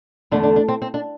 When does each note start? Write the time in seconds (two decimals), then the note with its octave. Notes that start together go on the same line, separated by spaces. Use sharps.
0.31 E2 D3 A3 D4
0.43 D4
0.56 D4
0.68 C4
0.82 C4
0.94 D4